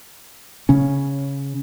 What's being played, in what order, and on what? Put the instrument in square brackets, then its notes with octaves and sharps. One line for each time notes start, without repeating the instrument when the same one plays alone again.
[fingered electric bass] C#3 C#4